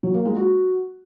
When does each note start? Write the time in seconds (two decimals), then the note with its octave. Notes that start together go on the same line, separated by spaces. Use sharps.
0.03 F#3
0.14 A#3
0.25 G#3
0.36 F#4